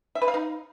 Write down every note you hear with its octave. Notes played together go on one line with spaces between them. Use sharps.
E5
B4
F5
D#4